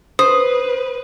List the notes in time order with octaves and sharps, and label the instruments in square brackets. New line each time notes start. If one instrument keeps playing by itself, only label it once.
[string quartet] B4 [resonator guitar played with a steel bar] C5 [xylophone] D#6